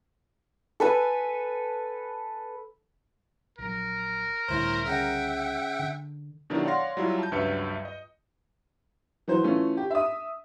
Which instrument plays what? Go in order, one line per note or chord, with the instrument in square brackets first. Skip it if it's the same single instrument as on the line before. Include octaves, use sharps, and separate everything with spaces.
[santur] A4 B4 G#5
[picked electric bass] A#1 F#3 [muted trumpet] A#4
[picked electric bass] C#2 D3 G3 [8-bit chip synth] A2 E4 C5
[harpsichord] C#3 [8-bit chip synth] E5 F#5 G5
[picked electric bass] D3
[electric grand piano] B2 D#3 F#3 D4 E4 G4
C#5 D5 F5 F#5 C6 A#6
F#3 G3 E4 F4
A5 G6
C#2 G2 F#3 B4 E5 C#7
D#5
[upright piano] E3 F#3 C5
E3 A3 C#4 F4
G4
E5 D#6